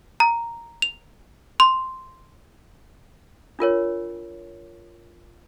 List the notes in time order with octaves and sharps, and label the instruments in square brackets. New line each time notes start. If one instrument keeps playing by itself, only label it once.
[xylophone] A#5
F7
C6
[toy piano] D4 F4 A#4 C#5